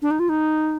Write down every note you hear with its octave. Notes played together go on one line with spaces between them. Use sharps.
D4
D#4
F4
D#4